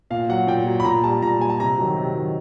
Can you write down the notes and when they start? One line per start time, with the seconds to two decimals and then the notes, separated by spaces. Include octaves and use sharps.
0.10 A#2 F5
0.29 F#3 F#5
0.47 A#2 G5
0.66 F#3
0.80 B5
0.85 A#2 A#5
1.04 G3 A5
1.22 A#2 A#5
1.41 G3 G#5
1.50 A5
1.60 C3 A#5
1.78 D#3 F#3
1.97 C3
2.15 D#3 F#3